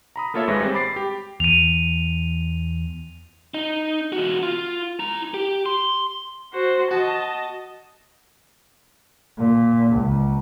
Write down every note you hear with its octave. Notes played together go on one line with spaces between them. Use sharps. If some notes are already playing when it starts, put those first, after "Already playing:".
A#5 B5 D#6
A3 A#3 F4 A4 C#5 E5
G#1 G#2 G#3 B4 C#5 A#6
G3 G#3 C4
B5 D6 A6 C7
G4
E2 D#7 F7
D#4
E2 F#4
F4
E4 A#5
G4
C6
F#4 C5
F#4 D#5 A5
A#2
C#2